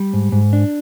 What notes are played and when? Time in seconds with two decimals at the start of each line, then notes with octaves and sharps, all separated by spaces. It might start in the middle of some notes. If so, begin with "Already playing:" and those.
Already playing: G3
0.13 G#2
0.32 G#2
0.53 D4